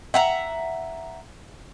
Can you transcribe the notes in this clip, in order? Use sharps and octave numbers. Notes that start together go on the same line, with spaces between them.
E5 F#5 A#5